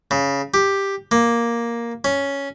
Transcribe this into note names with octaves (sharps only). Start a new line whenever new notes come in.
C#3
G4
A#3
C#4